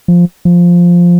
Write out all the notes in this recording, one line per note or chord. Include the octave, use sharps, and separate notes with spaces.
F3
F3